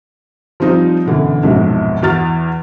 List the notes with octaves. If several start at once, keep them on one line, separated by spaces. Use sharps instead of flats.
F3 G3 C4 D#4 F4
F#2 B2 D3 E3
A#1 F2 G#2 B2 F#3
E2 F#4 F6 A6